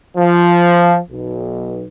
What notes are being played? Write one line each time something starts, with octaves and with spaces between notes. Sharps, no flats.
F3
B1